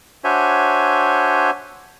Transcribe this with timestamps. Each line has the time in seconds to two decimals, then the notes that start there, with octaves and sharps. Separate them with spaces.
0.24 D4 F#4 C5 C#5 E5 G#5